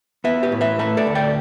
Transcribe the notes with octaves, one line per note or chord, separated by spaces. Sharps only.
B3 B4 E5
G4 B4
A2
B4 E5
A3 B4 E5
A4 D5
D2
D5 G5